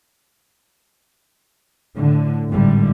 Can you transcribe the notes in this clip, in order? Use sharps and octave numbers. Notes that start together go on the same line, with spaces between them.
A2 D3
G#1 A2 D3 G3